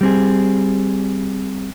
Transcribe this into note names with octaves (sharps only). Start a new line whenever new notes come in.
G3 C4 G#4